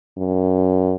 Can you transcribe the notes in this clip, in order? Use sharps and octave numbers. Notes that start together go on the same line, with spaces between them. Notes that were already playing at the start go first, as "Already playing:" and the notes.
F#2